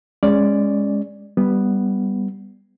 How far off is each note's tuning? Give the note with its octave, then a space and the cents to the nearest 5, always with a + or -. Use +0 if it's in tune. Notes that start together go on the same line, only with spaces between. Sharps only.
G#3 -15 C#4 +0 D5 +0
G3 +0 B3 +0